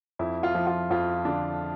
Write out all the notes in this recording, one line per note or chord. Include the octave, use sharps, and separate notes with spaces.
F2 E4
F4
F3
F4
F2 F4
D3 D4